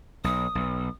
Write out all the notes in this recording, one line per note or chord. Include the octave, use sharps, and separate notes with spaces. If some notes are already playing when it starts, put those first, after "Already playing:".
B1 D#6
B1